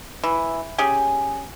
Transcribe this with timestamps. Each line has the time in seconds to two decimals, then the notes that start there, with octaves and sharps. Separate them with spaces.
0.24 E3
0.78 C#4 G4 G#4